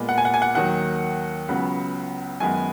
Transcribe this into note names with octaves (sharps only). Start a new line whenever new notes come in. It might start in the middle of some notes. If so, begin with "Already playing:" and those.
Already playing: A#2 G#3 B3
F#5
G#5
F#5
G#5
F#5
D#2 D#3 F#3 F#5
C#2 C#3 F#3 B3
F#2 D#3 G#3 B3 G#5